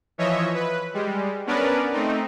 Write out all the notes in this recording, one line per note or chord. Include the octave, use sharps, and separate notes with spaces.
E3 F3 C#5 D#5 E5
B4
G3 G#3
B3 C#4 D4 A#4 B4 D5
A3 C4 D#4